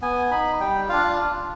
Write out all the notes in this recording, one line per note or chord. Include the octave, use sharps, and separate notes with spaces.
B3 G#5
D#4 B5
G3 G5
D4 F4 F5